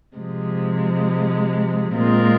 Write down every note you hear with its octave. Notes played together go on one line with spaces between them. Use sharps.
C3 F3 G#3
A#2 G#3 C4 F4 A#4